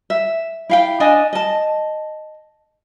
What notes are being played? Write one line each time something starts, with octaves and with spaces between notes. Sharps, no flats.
E5
E4 F5 G5
D4 D5 D#5 G#5
D#5 A5